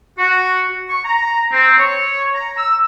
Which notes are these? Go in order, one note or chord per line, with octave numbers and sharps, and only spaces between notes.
F#4
C#6
A#5
C4
C#5
A#5
E6